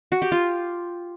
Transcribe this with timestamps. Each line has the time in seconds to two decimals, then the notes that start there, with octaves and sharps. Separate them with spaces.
0.12 F#4
0.22 G4
0.32 F4